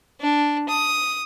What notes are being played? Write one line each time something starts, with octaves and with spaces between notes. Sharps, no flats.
D4
D#6